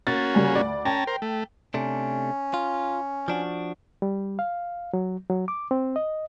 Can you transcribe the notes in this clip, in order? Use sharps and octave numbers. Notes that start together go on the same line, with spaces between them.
A#3 C#4 F#4 A6
C#3 G3 G#5
D2 D5
C#4 G5 A5 A#5
A#4 C5
A3
C3 A3 C#4 D4
F4
F3 D4 F#4
G3
F5
F#3
F#3
D6
C4
D#5